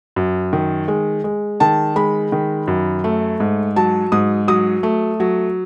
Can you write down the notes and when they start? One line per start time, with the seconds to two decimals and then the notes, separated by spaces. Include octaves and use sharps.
0.16 F#2
0.53 D#3
0.88 G#3
1.24 G#3
1.60 D#3 A5
1.96 G#3 B5
2.32 D#3
2.68 F#2
3.04 A3
3.40 G#2
3.76 F#3 A5
4.12 G#2 D#6
4.48 F#3 D#6
4.83 A3
5.20 F#3